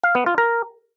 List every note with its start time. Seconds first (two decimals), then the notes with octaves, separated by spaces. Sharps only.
0.03 F5
0.15 B3
0.26 F4
0.38 A#4